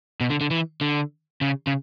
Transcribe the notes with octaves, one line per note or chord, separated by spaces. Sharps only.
B2
D3
D3
E3
D3
C#3
C#3